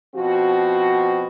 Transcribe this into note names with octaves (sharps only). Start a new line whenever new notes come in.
B2 F3 C4 F#4